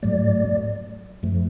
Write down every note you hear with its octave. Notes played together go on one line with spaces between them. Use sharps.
G#2 F#3 A3 D5
F#2 F3 A3